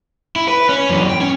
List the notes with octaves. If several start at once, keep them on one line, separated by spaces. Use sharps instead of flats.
E4
B4
C#4
F#2 E3
G5
C#4